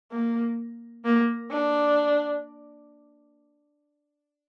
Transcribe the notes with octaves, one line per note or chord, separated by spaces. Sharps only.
A#3
A#3
D4